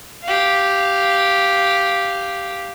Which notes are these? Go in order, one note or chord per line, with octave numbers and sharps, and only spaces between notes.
G4 F5